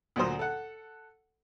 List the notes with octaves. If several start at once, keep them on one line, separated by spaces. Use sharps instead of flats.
D2 A#2 F#3 C5 D#6
A4 F#5